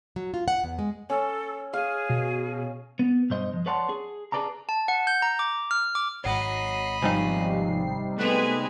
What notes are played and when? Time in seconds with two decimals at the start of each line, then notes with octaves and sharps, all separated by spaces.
0.16 F#3
0.34 F4
0.48 F#5
0.64 E2
0.79 G#3
1.10 C#4 A4
1.73 G#4 F5
2.09 B2
2.99 B3
3.30 B1 G2 C5 D#5
3.53 F3
3.66 B4 C#5 D5 F#5 A5 C6
3.89 G#4
4.32 G#4 A4 B4 D5 A5 A#5
4.69 A5
4.88 F#5
5.07 G6
5.22 A#5
5.39 D6
5.71 F6
5.95 D6
6.24 G#1 C#5 D#5 F#5 B5 C7
7.02 G#2 C3 F3 G3 D#4 G#5
8.18 G#3 A3 B3 G#4 F#6 B6